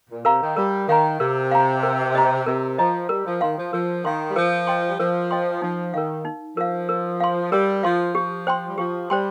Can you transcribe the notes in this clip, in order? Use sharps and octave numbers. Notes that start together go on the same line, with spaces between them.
A#2
C3 A#4 F5 A#5
D#3
G3 A#4
D#3 F5 A#5
C3 A#4
F5 A#5
A#4
D#5 A#5
C3 A#4
F3 D#5 A#5
G3 A#4
F3
D#3 F5 C6
F3
F3 A#4
D#3 F5 C6
G3
F3 A#4
D#5 G5 C6
G3
F3 A#4
D#5 G5 C6
F3 D#4
D#3 A#4 F5
D#4
F3 A#4 F5
A#4
F5 C6
G3 A#4
F3 F5 C6
F3 G4
C5 G5 C6
G3
F3 G4
G3 C5 G5 C6